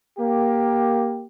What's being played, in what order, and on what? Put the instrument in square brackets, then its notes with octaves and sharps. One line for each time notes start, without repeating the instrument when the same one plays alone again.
[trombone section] A#3 G4